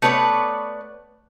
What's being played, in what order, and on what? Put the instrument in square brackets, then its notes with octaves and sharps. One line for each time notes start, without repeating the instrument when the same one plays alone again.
[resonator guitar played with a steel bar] A3 B3 B4 C#5 D5